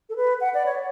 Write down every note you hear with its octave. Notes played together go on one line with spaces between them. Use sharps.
A4
B4
F#5
D5
C#5